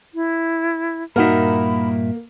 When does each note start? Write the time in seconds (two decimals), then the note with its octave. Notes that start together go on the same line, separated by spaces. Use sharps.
0.14 E4
1.16 G2 A#2 A#3 D#4 F#4 A#4 E5 B5